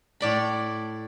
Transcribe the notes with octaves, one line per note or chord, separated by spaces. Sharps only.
A2 D5 B5